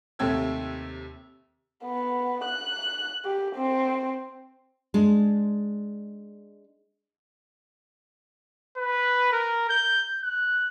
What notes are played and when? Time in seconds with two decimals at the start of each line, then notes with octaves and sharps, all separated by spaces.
0.19 D#2 C3 A3 G4 E6 G#6
1.85 B3
2.45 F#6
3.25 G4
3.56 C4
4.94 G#3 D4
8.77 B4
9.33 A#4
9.69 G6
10.23 F#6